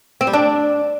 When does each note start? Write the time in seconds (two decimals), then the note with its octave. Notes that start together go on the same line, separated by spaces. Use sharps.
0.21 C4
0.27 G3
0.33 D4